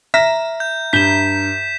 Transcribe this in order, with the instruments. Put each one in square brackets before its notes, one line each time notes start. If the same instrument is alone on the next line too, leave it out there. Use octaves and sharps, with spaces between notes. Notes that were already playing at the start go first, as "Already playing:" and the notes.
[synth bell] E5 A#5 [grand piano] F6 A#6 B6
[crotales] G6
[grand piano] G2 G6 G7 [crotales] B6 E7